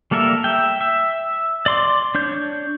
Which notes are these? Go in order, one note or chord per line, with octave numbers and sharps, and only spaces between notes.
G3 A#3 A4 A#4 E5
E5 G5
E5
D5 C6 D6
D4 C#5 G6